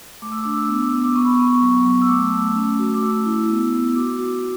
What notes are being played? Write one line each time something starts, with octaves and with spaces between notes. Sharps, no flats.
A3 D6
E6
D4 D6
E6
D6
B3
E6
D6
B3 E6
D6
B3 C#6
B5
C#6
B3
F#3
F#3
E6
A3 D6
A3
C#4
F#4
D6
A3 E6
E4
B3
B3
F#4 D6
F#4